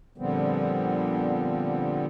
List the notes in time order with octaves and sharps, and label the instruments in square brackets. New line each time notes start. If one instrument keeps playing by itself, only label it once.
[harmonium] A#2 D3 F3 G3 B3 C4